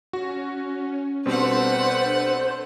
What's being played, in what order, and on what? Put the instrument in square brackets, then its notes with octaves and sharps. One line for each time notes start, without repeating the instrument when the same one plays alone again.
[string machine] C#4 [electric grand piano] F#4
[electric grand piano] B2 G3 C4 [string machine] D4 A4 [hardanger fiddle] B4 F#5 [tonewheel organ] C5